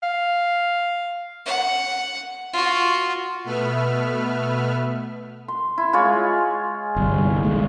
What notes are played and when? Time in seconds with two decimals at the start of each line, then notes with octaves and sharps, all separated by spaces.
0.03 F5
1.46 F#5
2.53 F4 F#4
3.44 B2 A3 B3 B4 E5 F6
5.48 C6
5.78 E4
5.93 G#3 F4 C#5
6.96 G1 C2 G3
7.43 D#3 G#3 A3